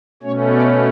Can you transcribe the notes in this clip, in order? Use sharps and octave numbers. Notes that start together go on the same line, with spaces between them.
B2 A3 C#4 C#5
D5